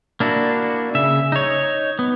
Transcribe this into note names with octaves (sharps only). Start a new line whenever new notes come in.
A#3 D4 E4 F#4
C#3 E5
D#4 C#5
B3